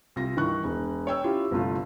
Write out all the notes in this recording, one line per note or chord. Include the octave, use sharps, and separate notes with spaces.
C2 F4 A#6
G2 D#3 E3 C#6 F#6
E1
C#5 G5 E6
C#4 E4 F4 G4
G1 C2 A3 F4